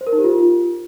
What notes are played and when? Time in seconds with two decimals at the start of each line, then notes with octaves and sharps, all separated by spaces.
0.01 C5
0.07 A#4
0.12 D#4
0.18 G4
0.24 F4